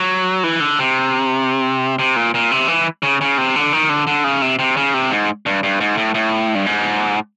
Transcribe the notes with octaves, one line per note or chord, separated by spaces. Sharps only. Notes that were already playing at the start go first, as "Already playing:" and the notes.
Already playing: F#3
E3
D3
C3
C3
A#2
A#2
C3
E3
C#3
C#3
C3
D3
D#3
D3
D3
C#3
C3
C3
C#3
C3
G#2
G2
G2
G#2
A2
A2
G2
G#2